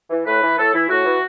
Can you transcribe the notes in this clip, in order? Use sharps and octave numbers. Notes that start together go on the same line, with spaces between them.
E3
A2 B4
E3
A2 A4
E3 E4
A2 F#4
E3